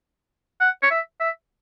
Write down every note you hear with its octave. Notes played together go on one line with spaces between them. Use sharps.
F#5
C#5
E5
E5